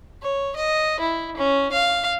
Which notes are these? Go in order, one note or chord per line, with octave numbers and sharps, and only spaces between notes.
C#5
D#5
E4
C#4
F5